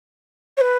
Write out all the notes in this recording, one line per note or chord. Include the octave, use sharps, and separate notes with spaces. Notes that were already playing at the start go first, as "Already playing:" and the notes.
C#5
B4